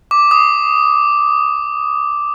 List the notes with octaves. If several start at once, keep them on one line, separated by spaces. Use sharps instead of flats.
D6
D#6